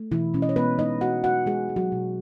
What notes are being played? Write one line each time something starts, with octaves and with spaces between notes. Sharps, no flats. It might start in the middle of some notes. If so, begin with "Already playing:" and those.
Already playing: A3
B2 E3 E4
B2 C#4
D#5
C#5
G#3 B3 B4
G#3 D#4 D#5
E3 F#4 F#5
G#3 F#4 F#5
G#3 G#4
G#3
F#3 F#4
B2